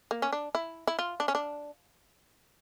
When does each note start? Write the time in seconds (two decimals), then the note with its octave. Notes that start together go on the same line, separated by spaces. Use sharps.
0.11 A#3
0.22 C#4
0.32 D4
0.55 E4
0.87 E4
0.99 F4
1.20 D4
1.28 C#4
1.35 D4